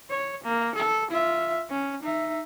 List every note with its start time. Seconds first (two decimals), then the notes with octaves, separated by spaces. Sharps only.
0.10 C#5
0.44 A#3
0.75 A4
1.11 F4 E5
1.70 C#4
2.03 D#4 E5